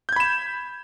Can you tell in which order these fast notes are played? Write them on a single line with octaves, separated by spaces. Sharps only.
G6 G#6 B5 E7